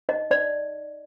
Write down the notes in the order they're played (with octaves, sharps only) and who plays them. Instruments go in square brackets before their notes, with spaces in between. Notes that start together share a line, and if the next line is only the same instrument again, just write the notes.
[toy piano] D#4 D#5
D#4 D5